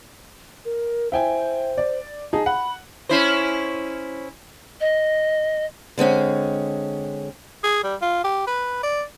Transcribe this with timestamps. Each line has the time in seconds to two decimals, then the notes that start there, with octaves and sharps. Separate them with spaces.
0.65 A#4
1.12 E4 C5 G5 G#5
1.78 D5
2.33 D#4 G#4 A5
2.46 F#5 B5
3.09 C#4 E4 C5
4.81 D#5
5.98 D3 G#3 C4 C#4
7.64 G#4
7.83 G3
8.02 F4
8.24 G4
8.47 B4
8.83 D5